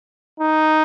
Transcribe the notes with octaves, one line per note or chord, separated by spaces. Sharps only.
D#4